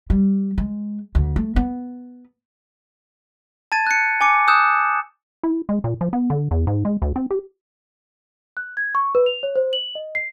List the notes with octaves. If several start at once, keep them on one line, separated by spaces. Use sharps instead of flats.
G3
G#3
D2
A3
B3
A5 G#6 A6 D#7
F#6 C#7
G#5 D6 C#7
D#6 E6 F#6 G6 E7
E4
G#3
A#2
F3
B3
D3
E2
G#2
G#3
D2
C4
G4
F#6
G#6
C#6
B4
F7
C#5
C5
F#7
D#5
C7